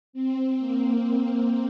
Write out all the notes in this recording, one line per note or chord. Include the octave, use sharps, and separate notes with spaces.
C4
A#3